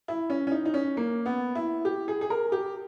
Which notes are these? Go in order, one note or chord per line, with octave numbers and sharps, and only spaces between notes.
E4
C#4
C#4
D#4
D#4
C#4
A#3
B3
E4
G4
G#4
G#4
A#4
G4